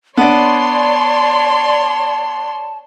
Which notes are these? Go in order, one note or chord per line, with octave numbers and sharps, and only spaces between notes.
B3 D4 C#5 D5 A5 C6